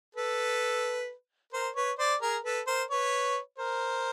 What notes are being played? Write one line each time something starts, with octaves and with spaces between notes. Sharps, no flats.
A4 B4
A#4 C5
B4 C#5
C5 D5
G#4 A#4
A4 B4
A#4 C5
B4 C#5
A#4 C5